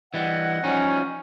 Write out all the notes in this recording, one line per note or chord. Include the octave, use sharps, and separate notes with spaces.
E3 G3 D#5 F#5
F3 G3 C#4 D#4